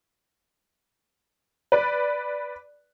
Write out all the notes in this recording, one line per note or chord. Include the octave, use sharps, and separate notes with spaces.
B4 D5